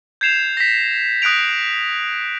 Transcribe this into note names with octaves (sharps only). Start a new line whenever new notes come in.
G6 G#6 C7 E7 F7
A#6 B6
D#6 F#6 A#6 D7 F7